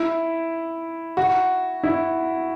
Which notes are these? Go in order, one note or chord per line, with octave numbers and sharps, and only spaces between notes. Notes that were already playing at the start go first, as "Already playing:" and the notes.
Already playing: E4
F#4
E4